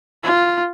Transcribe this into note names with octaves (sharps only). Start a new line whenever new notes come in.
F4